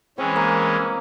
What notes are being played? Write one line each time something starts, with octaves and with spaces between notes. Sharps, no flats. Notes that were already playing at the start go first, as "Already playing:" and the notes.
E3 G#3 C4 C#4
A#3